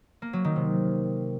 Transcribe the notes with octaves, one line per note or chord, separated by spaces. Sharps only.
A#3
F#3
D#3
C3